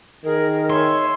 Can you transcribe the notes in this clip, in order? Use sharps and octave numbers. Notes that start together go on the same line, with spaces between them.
D#3 G#4 A#4
C#5 E5 G#5 C6